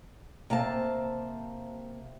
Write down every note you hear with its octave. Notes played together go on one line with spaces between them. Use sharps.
C3 A#3 C5 A5